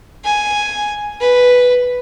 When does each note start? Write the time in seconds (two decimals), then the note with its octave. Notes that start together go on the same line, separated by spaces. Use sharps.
0.24 G#5
1.20 B4